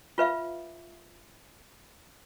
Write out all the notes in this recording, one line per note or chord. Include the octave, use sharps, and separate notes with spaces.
F4 B4 E5 F5